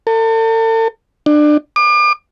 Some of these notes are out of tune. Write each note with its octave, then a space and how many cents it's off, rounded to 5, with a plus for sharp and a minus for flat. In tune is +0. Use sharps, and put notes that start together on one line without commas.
A4 +40
D4 +25
D6 +35